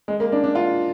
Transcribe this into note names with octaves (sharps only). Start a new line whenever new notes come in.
G#3
A#3
D4
D4
F4